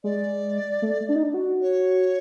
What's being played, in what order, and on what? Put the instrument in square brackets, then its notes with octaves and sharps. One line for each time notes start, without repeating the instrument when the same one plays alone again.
[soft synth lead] G#3 [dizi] D5
[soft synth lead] A3
D4
D#4
D4
F#4
[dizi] C#5